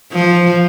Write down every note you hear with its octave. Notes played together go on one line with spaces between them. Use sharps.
F3